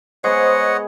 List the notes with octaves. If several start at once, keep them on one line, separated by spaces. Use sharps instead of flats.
G#3 B3 G#4 C5 C#5 D#5 F#5